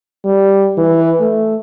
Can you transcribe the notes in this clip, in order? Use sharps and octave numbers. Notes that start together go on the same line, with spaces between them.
G3
E3
A3